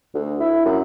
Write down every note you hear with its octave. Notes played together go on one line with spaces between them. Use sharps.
D2
E4
F#2